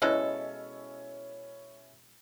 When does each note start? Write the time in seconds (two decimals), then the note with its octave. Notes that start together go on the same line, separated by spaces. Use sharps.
0.02 B2 G#3 C#4 E4 A4